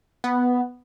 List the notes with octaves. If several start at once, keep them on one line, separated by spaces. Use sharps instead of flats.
B3